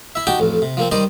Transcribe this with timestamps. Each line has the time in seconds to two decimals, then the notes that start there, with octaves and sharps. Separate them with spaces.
0.15 E4 E5
0.27 D#4 F#4 G4 G5 A5 D6
0.40 A1 F2
0.62 C3
0.77 F3 A#3 C4
0.91 D#3 G3 C5 D5 D#5 D6